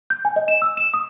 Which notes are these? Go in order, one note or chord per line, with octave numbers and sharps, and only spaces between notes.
G6
G#5
D#5
E7
E6
E7
D#6